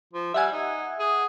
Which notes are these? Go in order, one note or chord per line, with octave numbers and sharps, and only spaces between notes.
F3
G3 E5 F#5 G#5
D#4
G#4